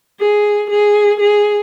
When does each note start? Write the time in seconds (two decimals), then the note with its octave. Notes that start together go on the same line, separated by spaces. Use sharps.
0.20 G#4
0.70 G#4
1.20 G#4